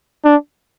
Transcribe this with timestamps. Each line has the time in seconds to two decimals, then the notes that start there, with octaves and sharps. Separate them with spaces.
0.25 D4